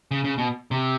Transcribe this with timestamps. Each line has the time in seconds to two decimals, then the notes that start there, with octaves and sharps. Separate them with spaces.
0.11 C#3
0.24 C#3
0.38 B2
0.71 C3